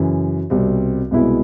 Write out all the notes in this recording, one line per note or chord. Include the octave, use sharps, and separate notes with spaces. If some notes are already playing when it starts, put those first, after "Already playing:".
Already playing: F#2 C#3 E3
C2 B2 G3 C4
C2 B2 G#3 B3 E4